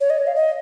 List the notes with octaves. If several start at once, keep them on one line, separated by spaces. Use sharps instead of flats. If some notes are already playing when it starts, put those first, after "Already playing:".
C#5
D#5
C#5
F5
D#5